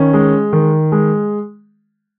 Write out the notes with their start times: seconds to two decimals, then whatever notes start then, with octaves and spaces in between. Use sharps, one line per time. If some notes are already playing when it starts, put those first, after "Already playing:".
Already playing: D#3 C#4
0.13 G#3
0.53 D#3
0.92 G#3